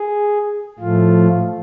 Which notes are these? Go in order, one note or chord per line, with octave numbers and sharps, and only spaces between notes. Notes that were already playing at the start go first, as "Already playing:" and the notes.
Already playing: G#4
A2 F3 A3 F4